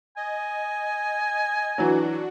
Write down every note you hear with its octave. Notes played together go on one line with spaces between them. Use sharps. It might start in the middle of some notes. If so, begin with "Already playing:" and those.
D#5 G#5
E3 F#3 D4 F#4